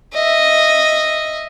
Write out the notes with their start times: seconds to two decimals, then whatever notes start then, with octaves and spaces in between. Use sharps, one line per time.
0.13 D#5 E5